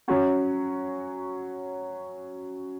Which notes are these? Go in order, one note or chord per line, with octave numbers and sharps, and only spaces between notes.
F#3 C#4 F#4